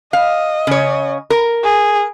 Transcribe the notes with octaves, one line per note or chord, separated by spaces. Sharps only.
D#5 F5
C#3 C#5
A#4
G#4